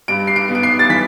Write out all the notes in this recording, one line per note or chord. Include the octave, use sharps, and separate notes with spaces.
G2 D7
C7
D7
B3
D7
C7
A6
E3 B6